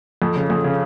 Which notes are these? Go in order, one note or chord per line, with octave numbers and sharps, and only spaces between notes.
F2
C#3
F2
C#3